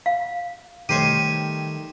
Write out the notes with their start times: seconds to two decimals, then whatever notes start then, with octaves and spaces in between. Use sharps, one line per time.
0.06 F5
0.89 D#3 G3 A3 G4 C5 C#5 D#7